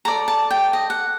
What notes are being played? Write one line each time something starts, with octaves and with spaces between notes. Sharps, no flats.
A4 D5 A#5
A5
G5
D#5
F#5